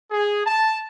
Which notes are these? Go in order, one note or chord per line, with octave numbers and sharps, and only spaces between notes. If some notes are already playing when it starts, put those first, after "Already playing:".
G#4
A5